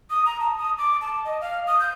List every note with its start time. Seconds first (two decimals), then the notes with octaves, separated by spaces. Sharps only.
0.10 D#6
0.25 A#5
0.40 A5
0.58 D#6
0.78 D6
1.01 A5
1.25 D#5
1.41 F5
1.67 D#6
1.80 G6